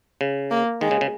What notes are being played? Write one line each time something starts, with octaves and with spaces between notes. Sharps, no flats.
C#3
A#3
D#3 G#3
C#3
C#3